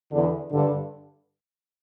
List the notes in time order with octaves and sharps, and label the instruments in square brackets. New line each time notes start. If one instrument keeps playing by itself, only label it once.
[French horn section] E2 D3
G2 D3